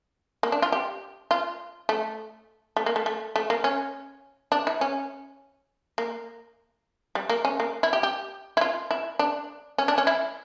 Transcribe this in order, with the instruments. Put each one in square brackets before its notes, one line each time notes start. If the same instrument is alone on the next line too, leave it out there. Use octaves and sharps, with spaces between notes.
[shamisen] A#3
D4
F4
G4
F4
A3
A3
A#3
A3
A3
A3
A#3
C#4
D4
E4
C#4
A#3
G3
A#3
C#4
A#3
E4
G4
G4
E4
F4
E4
D4
C#4
D4
C#4
E4